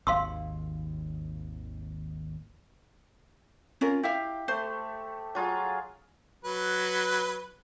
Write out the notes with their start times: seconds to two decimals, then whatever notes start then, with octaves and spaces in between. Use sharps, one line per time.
0.07 G#1 D#2 F5 C6 E6
3.81 C#4 F4 A#4
4.03 E4 G4 E5 F5
4.48 A3 C5
5.35 F#3 F4 G#4
6.45 F#3 B4